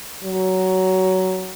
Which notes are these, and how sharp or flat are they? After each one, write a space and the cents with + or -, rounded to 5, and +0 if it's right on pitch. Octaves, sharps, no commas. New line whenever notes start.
F#3 +15